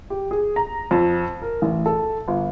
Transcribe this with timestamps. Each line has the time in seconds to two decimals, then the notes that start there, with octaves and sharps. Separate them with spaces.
0.10 G4
0.31 G#4
0.56 A#5
0.91 F2
1.42 A#4
1.62 A1
1.86 A4
2.28 G1